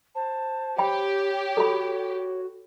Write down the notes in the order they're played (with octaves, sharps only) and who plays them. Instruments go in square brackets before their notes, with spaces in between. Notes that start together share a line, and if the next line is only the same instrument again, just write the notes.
[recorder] C5 [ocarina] A5
[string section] G4 [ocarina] C#5 [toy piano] G5 B5
[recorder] F#4 [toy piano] A4 B5